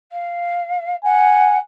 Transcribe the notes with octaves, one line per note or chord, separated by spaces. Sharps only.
F5
F#5 G#5